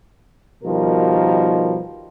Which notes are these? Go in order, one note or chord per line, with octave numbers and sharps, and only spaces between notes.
B2 D#3 F3 G3 A#4